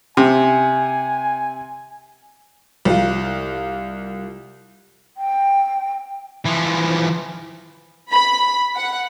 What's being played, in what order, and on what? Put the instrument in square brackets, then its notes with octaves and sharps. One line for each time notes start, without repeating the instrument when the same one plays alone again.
[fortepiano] C3 [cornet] G#5
[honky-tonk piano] C2 F4
[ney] G5
[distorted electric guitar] E3 F3
[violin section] B5
F#5